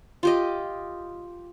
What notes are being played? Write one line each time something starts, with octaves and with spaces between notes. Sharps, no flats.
F4 G4 D#5